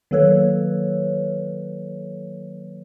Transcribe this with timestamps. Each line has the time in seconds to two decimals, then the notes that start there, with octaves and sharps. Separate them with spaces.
0.11 D#3 F#3 A#3 A4 B4 C#5